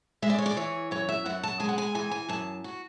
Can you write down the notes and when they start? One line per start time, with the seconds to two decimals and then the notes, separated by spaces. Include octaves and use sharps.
0.22 G#3 E5
0.30 D5
0.38 C#5
0.46 D5
0.57 E3 C#5
0.91 F#2 C#5
1.09 E5
1.26 F#2 F#5
1.43 A5
1.60 G#3 G#5
1.69 F#5
1.78 G#5
1.95 E3 G#5
2.11 G#5
2.29 F#2 A5
2.64 F#4